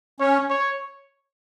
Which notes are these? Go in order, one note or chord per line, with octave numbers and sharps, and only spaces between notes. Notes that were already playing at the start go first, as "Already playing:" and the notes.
C#4 C#5
C#5